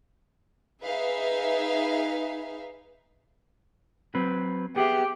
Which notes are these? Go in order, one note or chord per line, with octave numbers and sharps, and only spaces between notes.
D#4 G#4 B4 E5 F5
F#3 C4 B4
B3 G4 G#4 E5